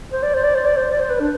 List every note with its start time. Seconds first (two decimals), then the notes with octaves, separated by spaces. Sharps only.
0.13 C5
0.23 D5
0.34 C5
0.44 D5
0.55 C5
0.66 D5
0.77 C5
0.91 D5
1.00 C5
1.10 B4
1.20 D4